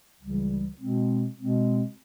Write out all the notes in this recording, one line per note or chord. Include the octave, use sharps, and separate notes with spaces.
C#2 C#3 E3 G3
B2 G#3 C4
B2 G#3 C4